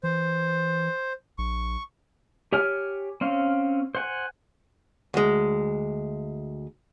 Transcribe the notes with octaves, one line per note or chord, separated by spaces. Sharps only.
E3 C5
A#1 C#6
G4 C#5 G#5 F6
C4 C#4 F5
C5 F#5 G#5
D2 G#3